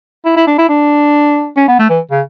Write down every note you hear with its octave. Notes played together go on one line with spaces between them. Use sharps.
E4
E4
D4
E4
D4
C#4
B3
A3
E3
C#3